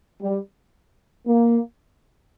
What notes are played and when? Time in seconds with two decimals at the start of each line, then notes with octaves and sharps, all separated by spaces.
0.21 G3
1.26 A#3